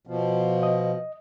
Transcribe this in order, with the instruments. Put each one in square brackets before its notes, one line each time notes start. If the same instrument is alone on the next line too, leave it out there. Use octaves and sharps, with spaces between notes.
[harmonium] B2 F3
[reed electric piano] D#5